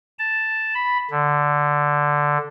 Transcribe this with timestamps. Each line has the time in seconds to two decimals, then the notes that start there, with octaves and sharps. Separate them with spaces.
0.19 A5
0.75 B5
1.11 D3